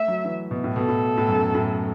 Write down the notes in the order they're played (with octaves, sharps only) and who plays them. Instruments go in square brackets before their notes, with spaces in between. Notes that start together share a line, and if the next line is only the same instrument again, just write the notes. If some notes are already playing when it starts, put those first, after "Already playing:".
Already playing: [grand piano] A3 [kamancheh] E5
[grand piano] F#3
E3
B2
A2
[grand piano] B2 [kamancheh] A4
[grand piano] A2
A2
F#2
A2